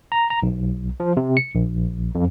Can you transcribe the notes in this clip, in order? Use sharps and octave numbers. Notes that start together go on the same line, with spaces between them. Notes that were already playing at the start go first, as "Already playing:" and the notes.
A#5
A#5
B1
F3
C3
C#7
A#1
F2